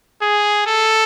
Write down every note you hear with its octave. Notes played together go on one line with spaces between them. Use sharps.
G#4
A4